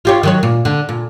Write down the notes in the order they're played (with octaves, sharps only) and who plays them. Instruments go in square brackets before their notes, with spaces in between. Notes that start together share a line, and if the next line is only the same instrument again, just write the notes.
[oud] F4 G4 C#5
D#3 F#3 C#5
A#2
D3
A#2